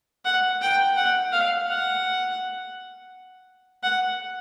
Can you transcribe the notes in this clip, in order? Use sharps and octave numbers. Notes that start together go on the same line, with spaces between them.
F#5
G5
F#5
F5
F#5
F#5